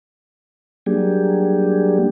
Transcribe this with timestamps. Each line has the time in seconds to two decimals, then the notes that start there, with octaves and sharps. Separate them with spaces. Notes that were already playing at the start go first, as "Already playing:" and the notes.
0.86 F#3 G3 A#3 D4 G4 G#4